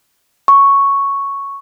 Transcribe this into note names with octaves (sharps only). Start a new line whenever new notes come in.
C#6